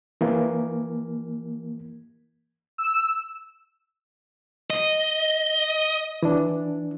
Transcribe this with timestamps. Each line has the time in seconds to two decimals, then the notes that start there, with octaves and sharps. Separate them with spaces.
0.21 E3 A#3
2.78 E6
4.70 D#5
6.23 E3 D4